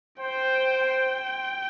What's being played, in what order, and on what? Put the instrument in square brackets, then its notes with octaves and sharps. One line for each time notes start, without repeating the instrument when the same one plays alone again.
[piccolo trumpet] C5 [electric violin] G5
[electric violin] G5